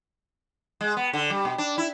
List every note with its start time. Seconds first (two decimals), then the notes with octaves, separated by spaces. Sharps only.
0.81 G#3
0.97 B3
1.13 D3
1.30 G3
1.45 B2
1.58 D4
1.78 E4